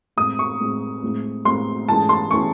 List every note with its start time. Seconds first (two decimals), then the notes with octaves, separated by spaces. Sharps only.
0.17 A2 G#3 C4 D#6
0.39 C#6
0.60 A2 G#3 C4
1.02 A2 G#3 C4
1.45 A2 G#3 C4 C6
1.88 G#2 E3 A3 C#4 G#4 A5
2.09 C6
2.31 E3 A3 C#4 G#4 C#6